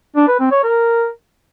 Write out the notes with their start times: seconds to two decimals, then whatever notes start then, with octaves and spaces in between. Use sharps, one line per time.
0.16 D4
0.28 B4
0.40 C4
0.52 C#5
0.63 A#4